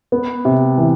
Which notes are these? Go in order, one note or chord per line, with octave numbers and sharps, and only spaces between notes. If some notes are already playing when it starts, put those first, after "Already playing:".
B3
C3
E3